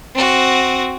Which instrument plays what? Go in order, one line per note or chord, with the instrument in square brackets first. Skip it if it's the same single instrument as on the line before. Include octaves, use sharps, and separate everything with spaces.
[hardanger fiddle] C4 F#4